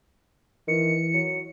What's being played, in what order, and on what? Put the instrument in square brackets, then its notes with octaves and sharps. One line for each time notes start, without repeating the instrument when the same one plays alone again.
[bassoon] D#3 [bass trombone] E3 [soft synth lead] C#7
[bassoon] F#3